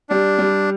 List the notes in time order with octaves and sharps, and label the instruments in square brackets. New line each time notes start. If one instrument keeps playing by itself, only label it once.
[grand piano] G3 [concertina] D4
[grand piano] G3